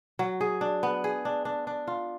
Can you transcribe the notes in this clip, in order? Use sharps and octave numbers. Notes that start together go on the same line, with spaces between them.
F#3
G#4
D4
B3
G#4
D4
D4
D4
F4